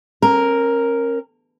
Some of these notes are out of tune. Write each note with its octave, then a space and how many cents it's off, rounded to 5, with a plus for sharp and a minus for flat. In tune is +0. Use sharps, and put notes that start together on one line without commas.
C#4 -40 A#4 +0